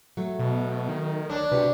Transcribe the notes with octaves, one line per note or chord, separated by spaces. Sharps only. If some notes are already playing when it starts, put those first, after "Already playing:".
F#3 A3
B2
D#3
D2 D4 C#5
C3 F#4 G4 B4